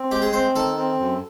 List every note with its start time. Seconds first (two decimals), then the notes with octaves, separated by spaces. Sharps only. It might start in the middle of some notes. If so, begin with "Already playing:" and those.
Already playing: C4
0.11 G#3 G4
0.22 G#4
0.33 C4 C5
0.55 D#3 A4
0.78 C4
1.00 F#2